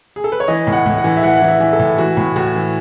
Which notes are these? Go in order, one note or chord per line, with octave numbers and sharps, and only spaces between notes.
G#4
A4
B4
C#5
E3 D#5
A2
F#5
A2
F#5
E3
E5
E3 F#5
F#5
E3
E5
E3
A4
A2
E3 F#4
A2
A2 F#4
E3